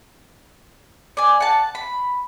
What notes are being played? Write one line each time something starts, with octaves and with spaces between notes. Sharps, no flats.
D5 G#5
F#5 A5
B5